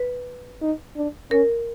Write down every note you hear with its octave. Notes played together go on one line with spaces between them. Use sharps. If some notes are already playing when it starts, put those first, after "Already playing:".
Already playing: B4
D#4
D4
C#4 A#4